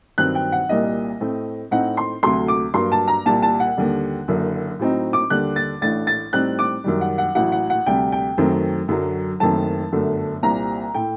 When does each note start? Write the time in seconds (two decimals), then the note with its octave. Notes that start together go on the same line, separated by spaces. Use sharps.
0.18 G2 D#3 F#3 C4 F#6
0.35 G5
0.52 F#5
0.69 C2 A#2 G3 A#3 D#5
1.20 A2 A3 C4
1.71 A2 A3 C4 D#4 F#5
1.97 C6
2.23 D2 C3 F#3 A3 C6
2.48 D6
2.74 G2 F#3 A#3 C6
2.92 A5
3.08 A#5
3.25 C2 A#2 G3 A5
3.43 A5
3.60 F#5
3.77 D#2 D3 G3
4.28 F#1 F#2 D3
4.79 A2 F#3 C4 D#4
5.13 D6
5.30 D#2 D3 G3 F#6
5.56 A6
5.81 A1 A2 A3 D4 A6
6.07 A6
6.33 A2 G3 C4 D#4 F#6
6.59 D6
6.84 F#2 D#3 G3
7.01 F#5
7.18 F#5
7.35 A1 A2 F#3 F#5
7.52 F#5
7.70 F#5
7.86 D2 C3 G3 G5
8.12 G5
8.38 F#2 D#3 F#3 A3 C4
8.88 F#2 D3 F#3
9.40 F#1 F#2 D#3 A3 C4 A5
9.92 G1 F#2 D3 A3
10.43 C2 A#2 G3 C4 A#5
10.94 A2 A3 G5